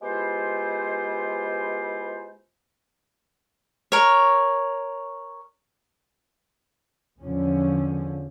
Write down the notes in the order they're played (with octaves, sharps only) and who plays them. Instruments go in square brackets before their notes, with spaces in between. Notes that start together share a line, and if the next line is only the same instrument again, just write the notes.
[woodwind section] G#3 B3 E4 F4 G4 C5
[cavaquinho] A#4 C#5
[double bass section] E2 D3 F3 C#4